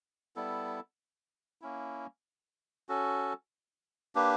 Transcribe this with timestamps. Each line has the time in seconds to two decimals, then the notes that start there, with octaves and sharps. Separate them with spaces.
0.36 G3 B3 E4 A4
1.61 A#3 C#4 E4
2.89 C#4 F#4 A4
4.15 A#3 D4 G4 B4